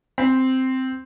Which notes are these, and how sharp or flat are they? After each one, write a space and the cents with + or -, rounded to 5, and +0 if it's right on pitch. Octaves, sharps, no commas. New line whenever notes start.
C4 -5